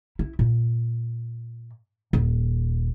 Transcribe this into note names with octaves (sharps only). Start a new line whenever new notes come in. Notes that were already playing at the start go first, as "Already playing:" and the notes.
E4
A#2
D#1